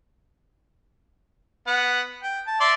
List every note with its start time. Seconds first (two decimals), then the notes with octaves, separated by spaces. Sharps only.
1.67 B3 F#5
2.23 G5
2.47 A5
2.61 D5 E5 C6